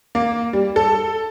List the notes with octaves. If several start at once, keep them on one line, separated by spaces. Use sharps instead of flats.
A#3
G3
A4